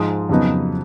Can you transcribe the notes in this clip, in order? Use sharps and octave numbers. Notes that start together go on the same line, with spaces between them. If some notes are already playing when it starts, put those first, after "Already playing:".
Already playing: G#2 F3 G#3 D#6
F2 C#3 F#3 B3 D#4